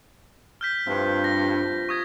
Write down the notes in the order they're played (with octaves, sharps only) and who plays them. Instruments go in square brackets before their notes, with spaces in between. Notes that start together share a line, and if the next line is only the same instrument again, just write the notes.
[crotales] F6 G6 B6
[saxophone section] G2 [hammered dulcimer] C3 F3 C4
[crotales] A#6
C#6 D#6 G#6